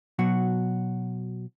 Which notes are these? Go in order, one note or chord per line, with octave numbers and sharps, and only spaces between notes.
B2 F#3 F#4